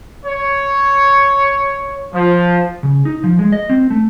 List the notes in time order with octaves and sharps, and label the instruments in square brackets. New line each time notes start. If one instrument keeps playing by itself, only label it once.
[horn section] C#5
F3
[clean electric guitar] C#3
D#4
F3
G#3
D#5
C4
A3